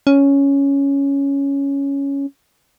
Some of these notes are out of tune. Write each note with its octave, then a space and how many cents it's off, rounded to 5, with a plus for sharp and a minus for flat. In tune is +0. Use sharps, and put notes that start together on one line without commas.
C#4 +5